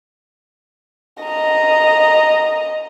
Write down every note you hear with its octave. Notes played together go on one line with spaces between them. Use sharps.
D#5 A#5